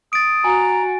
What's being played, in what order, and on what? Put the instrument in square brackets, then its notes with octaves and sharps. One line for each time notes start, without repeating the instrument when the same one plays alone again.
[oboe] D#6 [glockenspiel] A6 D7
[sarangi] F#4 [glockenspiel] G#5 [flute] A#5